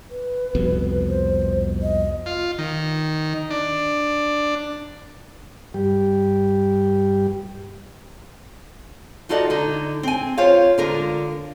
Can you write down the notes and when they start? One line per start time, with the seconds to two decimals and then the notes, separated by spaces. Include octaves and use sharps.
0.11 B4
0.55 C2 F2 B2
1.07 C5
1.82 D#5
2.26 F4
2.58 D#3
3.50 D4
5.74 G2 G3 G4
9.29 D#4 F4 F#4 A4 D5 D#5
9.50 D3 D#4
10.03 C4 G#5
10.37 F4 C5 C#5 F5
10.78 D3 G#3 F4 A#4